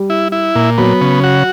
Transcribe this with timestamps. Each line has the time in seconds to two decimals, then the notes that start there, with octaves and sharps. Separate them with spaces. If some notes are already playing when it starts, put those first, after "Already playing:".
Already playing: G3
0.10 E4
0.32 E4
0.55 A#2
0.78 F#3 B3
1.01 C#3
1.23 F#4